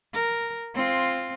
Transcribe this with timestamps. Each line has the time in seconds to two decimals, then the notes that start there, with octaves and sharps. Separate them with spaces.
0.14 A#4
0.75 C4 F4